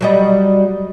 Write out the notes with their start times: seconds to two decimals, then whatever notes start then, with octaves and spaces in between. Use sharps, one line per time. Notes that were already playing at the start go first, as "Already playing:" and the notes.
0.01 F#3 G3 D#5